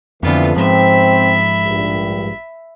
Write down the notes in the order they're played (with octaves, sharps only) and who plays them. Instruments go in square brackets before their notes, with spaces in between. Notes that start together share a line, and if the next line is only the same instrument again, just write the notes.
[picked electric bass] F2 D3 [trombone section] E3 F3 A3 [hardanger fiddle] B3 F4
[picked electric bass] G#2 F3 [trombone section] C4 [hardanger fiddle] E5 B5
[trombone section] A#1 G2